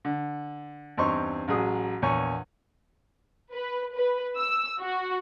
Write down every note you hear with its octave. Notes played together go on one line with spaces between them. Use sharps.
D3
E2 G2 C4 D#4 C6 C#6
A1 F#3 G#4 D#6
A#1 E2 C#5 G#5 C#6
B4
B4
E6
F#4